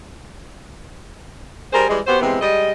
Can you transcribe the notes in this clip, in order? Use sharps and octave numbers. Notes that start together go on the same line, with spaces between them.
G3 G#4 A#4 C5
E3 G3 G#3
B3 F#4 G4 C5
C3 E3 G#3 B3 C4
G3 G#3 D#5